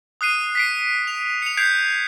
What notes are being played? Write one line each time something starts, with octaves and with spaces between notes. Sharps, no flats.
D#6 F#6 C7 D#7
B6 C7 D7
F7
C#7 F7
G6 G#6 C7 D7 F7